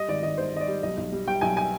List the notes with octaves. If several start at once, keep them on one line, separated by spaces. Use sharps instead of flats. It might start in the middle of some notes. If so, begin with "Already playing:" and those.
Already playing: G3 D#5
G#1 D5
G#1 D#5
G#1 C5
G#1 D#5
D5
G3
B1 D#5
B1
G3
G3 G5
B1 G#5
G#5